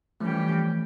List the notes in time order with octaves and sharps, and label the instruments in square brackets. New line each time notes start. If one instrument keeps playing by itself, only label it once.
[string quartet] E3 G3 C#4 G4 [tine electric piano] F3 A3